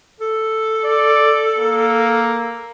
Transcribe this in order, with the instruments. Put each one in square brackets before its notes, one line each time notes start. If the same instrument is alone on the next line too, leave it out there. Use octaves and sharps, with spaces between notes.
[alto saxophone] A4
[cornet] D5
A#3